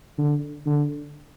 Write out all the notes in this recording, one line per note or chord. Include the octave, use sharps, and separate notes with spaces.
D3
D3